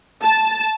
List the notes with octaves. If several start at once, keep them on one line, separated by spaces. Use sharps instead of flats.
A5